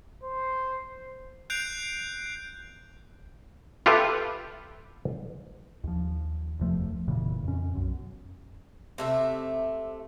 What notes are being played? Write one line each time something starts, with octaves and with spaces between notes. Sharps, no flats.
C5
F#6 G6 C7 D7 F7
F4 G4 A4 B4 E5
D#2 F3
F1 D2 F3 A3
F1 A#2 C#3 E3
F2 C#4
B1 F#2
C3 A3 E5